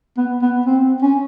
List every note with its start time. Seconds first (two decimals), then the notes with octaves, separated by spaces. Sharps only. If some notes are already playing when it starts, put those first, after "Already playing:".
0.17 B3
0.42 B3
0.66 C4
1.02 C#4